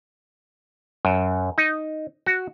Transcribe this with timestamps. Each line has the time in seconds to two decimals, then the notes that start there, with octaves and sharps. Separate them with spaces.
1.05 F#2
1.58 D#4
2.26 F#4